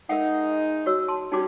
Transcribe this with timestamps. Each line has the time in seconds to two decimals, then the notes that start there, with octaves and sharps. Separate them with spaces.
0.09 G#3 D#4 A#4 E5 F#5
0.86 F#4 C#5 E6
1.08 A5 C6
1.32 G3 C#4 D#4 F#4 D6